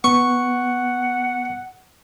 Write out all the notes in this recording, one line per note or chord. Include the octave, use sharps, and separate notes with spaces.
B3 F#5 C#6